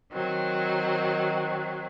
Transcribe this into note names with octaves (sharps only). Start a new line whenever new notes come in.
D#3 F#3 C4